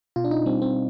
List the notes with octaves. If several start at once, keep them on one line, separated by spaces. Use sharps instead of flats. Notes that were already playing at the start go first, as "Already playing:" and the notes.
B2 F4
D4
D#4
G3 C4
C4